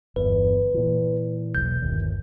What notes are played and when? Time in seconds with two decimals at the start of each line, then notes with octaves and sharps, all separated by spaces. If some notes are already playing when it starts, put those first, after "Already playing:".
0.16 G1 E2 B4
0.74 A#2 E3
1.55 E1 B1 G6
1.82 G1 D#2